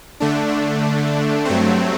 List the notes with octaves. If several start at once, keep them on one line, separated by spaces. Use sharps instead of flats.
D3 A3 D4
G2 F#3 A3 C4